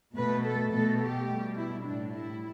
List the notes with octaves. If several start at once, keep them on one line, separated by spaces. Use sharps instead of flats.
B2 A3 B4
A4
B2 A3 A4
G4
B2 G3
E4
A2 G3 D4
E4